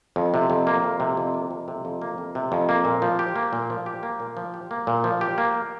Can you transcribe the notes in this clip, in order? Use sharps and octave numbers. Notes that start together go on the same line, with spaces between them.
F2
C3
F2
A#3
F2
C3
F2
A#3
F2
C3
F2
A#3
F2
C3
F2
A#3
A#2
F3
G4
A#3
A#2
F3
G4
A#3
A#2
F3
G4
A#3
A#2
F3
G4
A#3